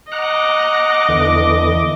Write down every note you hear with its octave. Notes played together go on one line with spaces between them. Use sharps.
D#5 F#5 A#5 D6 F#6
E2 D3 E3